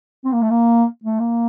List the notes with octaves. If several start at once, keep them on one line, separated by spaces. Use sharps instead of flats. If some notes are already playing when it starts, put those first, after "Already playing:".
C4
A#3
A3
A#3
A3
A#3